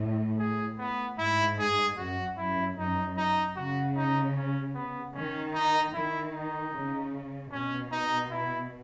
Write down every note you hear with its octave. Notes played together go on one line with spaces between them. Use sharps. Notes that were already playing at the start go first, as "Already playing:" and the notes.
Already playing: A2
G#4
B3
G#2 E4
G#4
F#2 F#4
F#2 E4
F#2 D#4
D#4
C#3 F#4
D#4
C#4
B3
D#3 C#4
D#4
D#3 E4
D#4
C#3
B2 C#4
D#4
E4